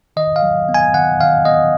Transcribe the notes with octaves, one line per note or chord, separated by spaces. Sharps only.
D#3 D#5
F5
F#3
B3
G#5
D#3 F#5
D#3 F5
B3 D#5